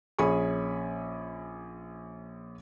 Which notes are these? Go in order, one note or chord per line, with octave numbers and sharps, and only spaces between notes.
A#1 C#4 G#4 G#5 B5 C#6